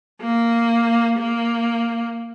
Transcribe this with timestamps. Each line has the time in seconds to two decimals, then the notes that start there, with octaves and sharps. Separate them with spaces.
0.21 A#3
1.19 A#3